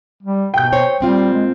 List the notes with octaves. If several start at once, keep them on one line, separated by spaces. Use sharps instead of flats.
G3
B2 G5 G6
C5 C#5
A#2 G3 C4 F4
G#3